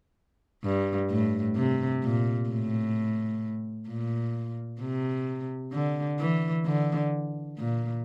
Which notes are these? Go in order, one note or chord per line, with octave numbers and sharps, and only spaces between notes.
G2
A2
C3
A#2
A2
A#2
C3
D3
E3
D3
A#2